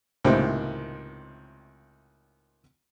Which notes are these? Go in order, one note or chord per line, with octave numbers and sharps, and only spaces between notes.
C#2 A2 C3 D#3 A#3 C4